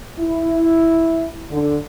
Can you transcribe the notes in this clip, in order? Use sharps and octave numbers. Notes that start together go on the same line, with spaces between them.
E4
D3